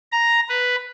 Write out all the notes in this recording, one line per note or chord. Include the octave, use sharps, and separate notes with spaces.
A#5
B4